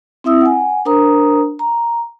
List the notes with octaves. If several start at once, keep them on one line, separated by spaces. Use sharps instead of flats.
C4 E4 E5 D#6 E6
F#5 G#5
D4 A#4 C5 A#5 D#6
A#5